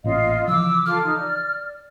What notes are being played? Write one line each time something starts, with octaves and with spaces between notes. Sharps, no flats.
A1 A#2 C#4 F4 D#5 F5
C#3 E3 F3 D6 E6
F4 A4 D6 F6
D#4
D5